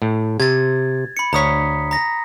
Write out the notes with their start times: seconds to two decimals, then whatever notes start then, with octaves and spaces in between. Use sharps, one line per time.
0.02 A2
0.40 C3 G#6 A6
1.17 B5 C#7
1.33 D2 C#5 A#5 D#6 B6
1.91 A#5 A#6